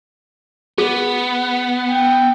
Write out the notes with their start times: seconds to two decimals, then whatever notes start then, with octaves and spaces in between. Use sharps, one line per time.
0.78 B3 G#4
1.90 G5